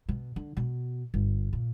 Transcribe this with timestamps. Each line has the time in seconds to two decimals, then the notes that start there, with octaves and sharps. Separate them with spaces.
0.09 B2
0.36 D3
0.57 B2
1.14 G1
1.53 A#2